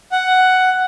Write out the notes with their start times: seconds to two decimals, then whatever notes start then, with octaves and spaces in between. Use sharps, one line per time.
0.12 F#5